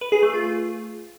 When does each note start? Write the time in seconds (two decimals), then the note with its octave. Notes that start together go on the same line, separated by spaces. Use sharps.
0.01 B4
0.12 G#4
0.23 A3
0.33 F4